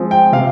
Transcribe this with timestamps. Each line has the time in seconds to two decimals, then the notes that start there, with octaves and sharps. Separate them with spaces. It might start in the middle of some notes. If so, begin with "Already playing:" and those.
Already playing: F3 G#3 C4
0.11 G5
0.32 C3 F5